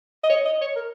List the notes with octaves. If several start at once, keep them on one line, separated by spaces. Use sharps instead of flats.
D#5
C#5
D#5
C#5
A#4